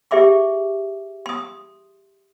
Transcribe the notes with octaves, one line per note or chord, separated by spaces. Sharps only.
G4 G#4 E5 C6 D6
C6 D#6